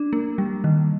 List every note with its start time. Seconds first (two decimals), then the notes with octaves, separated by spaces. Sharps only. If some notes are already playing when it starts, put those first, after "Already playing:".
Already playing: D4
0.13 A#3
0.38 G3
0.64 D#3